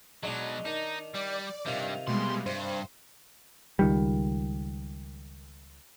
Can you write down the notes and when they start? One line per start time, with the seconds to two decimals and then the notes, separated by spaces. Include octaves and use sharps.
0.23 B2 F#3 G#3 D4 D#4
0.65 D#3 D4 D#4
1.15 G3 D5
1.66 G2 C3 D#3 G3 F4
2.08 B2 G3 G#3 C6
2.46 G2 C5
3.79 C#2 D#3 G3